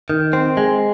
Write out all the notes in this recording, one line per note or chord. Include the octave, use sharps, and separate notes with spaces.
D#3
C4
G#3